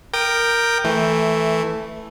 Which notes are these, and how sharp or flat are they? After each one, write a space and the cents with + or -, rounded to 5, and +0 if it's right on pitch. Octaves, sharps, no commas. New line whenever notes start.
A#4 +0 G5 +0 D#6 -45
E3 -10 A3 +0